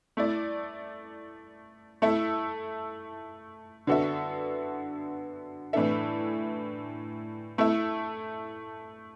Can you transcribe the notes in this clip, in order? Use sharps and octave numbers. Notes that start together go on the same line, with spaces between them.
A3 E4 D5
A3 E4 A4 E5
D3 B3 F#4 A4 E5
A2 E3 D4 A4 E5
A3 E4 A4 E5